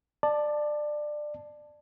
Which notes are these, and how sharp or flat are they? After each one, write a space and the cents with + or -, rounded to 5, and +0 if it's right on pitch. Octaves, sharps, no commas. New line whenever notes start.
D5 +20 A5 +0